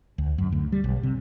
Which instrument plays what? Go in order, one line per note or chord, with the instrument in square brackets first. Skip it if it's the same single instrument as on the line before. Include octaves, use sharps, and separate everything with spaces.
[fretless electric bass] D2
F#2
D2
G3
B1
C3